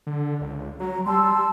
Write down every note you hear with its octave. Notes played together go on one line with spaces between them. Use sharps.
D3
C#2
F#3 A#5
G3 A5 C6 E6